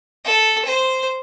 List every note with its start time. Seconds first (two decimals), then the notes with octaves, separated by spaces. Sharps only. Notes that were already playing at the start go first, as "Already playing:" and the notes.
0.25 A4
0.65 C5